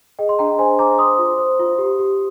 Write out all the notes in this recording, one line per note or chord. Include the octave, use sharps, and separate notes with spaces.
G#4 D#5 G5
C6
D4 G5 A#5
C5 G#5 C6
C5 A#5 D6
C5 C6 D#6
F4
C5
F4
G4
G4